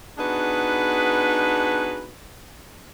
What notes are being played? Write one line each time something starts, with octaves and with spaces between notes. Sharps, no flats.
B3 D4 D#4 F#4 G#4 B4